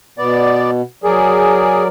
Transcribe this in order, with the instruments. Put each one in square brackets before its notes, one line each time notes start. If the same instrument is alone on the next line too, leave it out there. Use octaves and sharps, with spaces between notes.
[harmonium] B2 [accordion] B3 D5
[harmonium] F#3 A#4 D5 [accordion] G#4